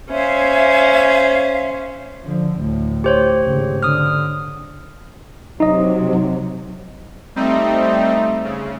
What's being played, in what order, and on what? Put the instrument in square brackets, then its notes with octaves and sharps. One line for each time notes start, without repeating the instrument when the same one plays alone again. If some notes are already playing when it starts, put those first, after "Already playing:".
[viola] C#4 C5 [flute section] E5 F5 G#5
[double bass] D3 F3
D2 A2
[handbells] G4 C5 C#5
[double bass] G#1 C#3
[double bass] D3 [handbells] D#6 F6
[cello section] C3 F#3 [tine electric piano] D#4 D#5
[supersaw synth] G3 C4 D#4 [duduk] A3
[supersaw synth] C#3